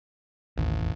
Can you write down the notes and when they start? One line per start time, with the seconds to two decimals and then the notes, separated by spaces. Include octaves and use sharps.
0.58 A1 D#2 D3
0.79 F1 E2